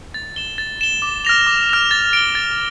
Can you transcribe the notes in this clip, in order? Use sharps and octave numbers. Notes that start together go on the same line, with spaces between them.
A6
E7 G7
A6
E7 G7
D6
F6 A#6 F7
D6
F6 A#6 F7
A6
D7 G7
A6